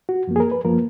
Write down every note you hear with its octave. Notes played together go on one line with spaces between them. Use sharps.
F#4
F#2 F3 A#3
G#4
A#4
B4
F#2 F3 A#3 A#4